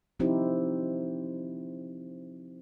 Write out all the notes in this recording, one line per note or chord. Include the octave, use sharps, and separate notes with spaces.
F3 C4 D#4 E4 G4 C5